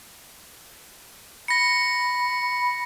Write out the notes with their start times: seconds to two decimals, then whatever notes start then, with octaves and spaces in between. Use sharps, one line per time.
1.48 B5 A#6 C#7